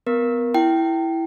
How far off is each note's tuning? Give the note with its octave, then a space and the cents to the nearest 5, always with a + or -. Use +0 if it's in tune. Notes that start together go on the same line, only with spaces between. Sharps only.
B3 +25 A#4 +15
E4 +0 G5 -15